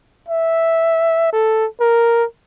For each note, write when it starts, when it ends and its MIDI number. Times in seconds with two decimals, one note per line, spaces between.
0.28 1.31 76
1.33 1.66 69
1.80 2.24 70